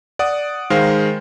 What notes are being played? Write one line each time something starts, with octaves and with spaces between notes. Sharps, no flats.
D5 F#5 D#6
D#3 G#3 A#4 C5 F5